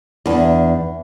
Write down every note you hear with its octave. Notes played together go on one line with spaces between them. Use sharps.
E2 D4